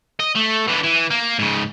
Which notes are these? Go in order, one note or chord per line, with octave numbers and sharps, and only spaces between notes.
D#5
A3
E3 D4
E3
A#3
G#2 C#3